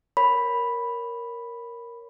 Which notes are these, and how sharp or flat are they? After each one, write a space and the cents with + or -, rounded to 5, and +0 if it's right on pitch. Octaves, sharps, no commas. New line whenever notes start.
A#4 +0 C#5 +0 B5 +0